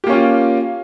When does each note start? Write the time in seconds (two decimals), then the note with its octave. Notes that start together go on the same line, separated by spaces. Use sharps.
0.04 G4
0.07 A#3
0.10 C#4
0.13 F4